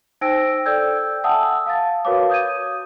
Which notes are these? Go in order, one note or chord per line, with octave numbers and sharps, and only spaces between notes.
D#4 C5 G5 E6 A#6 D7
A4 D5 G5 E6 G6 G#6
E5 F#5 G#5 A5 D#6 E6
F5 A5 A6
F#4 A#4 B4 C#5 F5 D6
D#6 G6 G#6 D#7